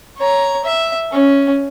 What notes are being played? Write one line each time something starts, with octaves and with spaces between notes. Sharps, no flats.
C#5 A#5
E5
C#4